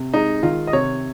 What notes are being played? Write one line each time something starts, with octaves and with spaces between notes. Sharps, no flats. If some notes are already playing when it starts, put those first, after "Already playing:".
Already playing: C3
G#3 D#4
D#3 F4
D#5
C3 C#5